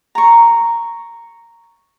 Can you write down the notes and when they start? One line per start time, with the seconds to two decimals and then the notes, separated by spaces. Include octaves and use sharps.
0.15 A#5 C#6